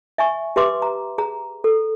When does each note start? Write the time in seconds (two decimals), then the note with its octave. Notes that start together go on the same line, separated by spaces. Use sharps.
0.18 E5 G#5 C#6
0.56 G4 B4 E5 C6 D6
0.82 A#5
1.18 G#4 A#5
1.64 A4